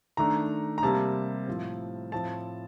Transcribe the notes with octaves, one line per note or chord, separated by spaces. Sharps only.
D#3 A3 D4 A#5
A#5
C3 G3 A#3 A5
A2 F3 C4
A2 F3 C4 A5